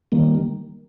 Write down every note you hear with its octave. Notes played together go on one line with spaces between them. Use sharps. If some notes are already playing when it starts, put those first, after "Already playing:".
D#3 G3 A#3